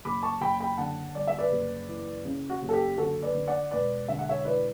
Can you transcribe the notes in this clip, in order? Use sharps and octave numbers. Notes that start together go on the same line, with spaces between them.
F#1 B5 D6
A5 C#6
F#1 G5 B5
G5 B5
D3 F#5 A5
G1 D5
E5
B4 D5
F#1
E3
C#3
F#4
F#1
A4
G4
D3 F#4 A4
B4 D5
D3
D5 F#5
E1 B4 D5
D3 E5
F#5
C#5 E5
E3 B4 D5